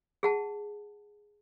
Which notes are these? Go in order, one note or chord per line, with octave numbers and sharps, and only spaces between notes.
G#4 F#5 A5